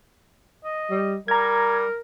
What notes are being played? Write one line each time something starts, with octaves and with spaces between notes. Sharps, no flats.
D#5
G3
G3 A#4 A#5 G#6